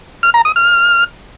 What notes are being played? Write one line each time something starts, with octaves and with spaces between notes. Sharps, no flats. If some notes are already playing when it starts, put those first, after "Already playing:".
F6
A#5
D#6
F6